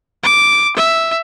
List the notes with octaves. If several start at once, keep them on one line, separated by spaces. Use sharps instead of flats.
D6
E5